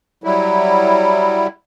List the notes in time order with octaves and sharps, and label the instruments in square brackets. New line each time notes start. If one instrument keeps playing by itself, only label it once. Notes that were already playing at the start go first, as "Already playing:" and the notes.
[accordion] F#3 G3 E4